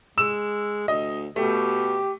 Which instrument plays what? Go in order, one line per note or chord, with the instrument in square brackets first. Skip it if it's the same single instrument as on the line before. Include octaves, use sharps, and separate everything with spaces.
[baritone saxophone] G#3 [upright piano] E6 E7
[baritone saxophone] D2 [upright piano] D#5
[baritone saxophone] B2 [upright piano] A3 [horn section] G4